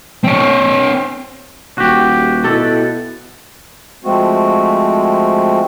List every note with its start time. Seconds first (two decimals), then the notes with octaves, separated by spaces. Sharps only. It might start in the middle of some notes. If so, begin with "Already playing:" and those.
0.24 C4 C#5
1.78 D#1 F#4 G4
2.44 B2 E4 A4
4.04 F3 G#3 A3 C4 F#4